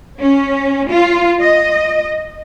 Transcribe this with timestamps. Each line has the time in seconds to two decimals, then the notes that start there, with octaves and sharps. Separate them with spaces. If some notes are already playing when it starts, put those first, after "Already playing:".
0.20 C#4
0.89 F4
1.40 D#5